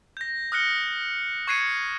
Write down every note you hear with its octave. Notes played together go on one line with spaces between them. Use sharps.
G6 A#6
D#6 F6 F#6 A#6 C#7 G7
C#6 F#6 G#6 C7 C#7 D#7